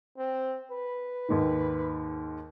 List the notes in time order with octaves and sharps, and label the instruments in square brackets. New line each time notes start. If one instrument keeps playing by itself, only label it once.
[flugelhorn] C4
B4
[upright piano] D#2 G#2 D#3